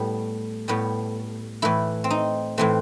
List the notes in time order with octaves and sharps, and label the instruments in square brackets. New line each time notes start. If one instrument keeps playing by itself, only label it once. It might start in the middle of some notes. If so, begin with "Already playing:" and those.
Already playing: [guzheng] A2 G3 B3
A2 G3 B3
A2 E3 A3 E4
C4
D#4
A2 E3 A3 C4